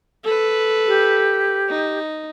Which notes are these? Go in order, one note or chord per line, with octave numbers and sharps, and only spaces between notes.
A4 B4
G4
D#4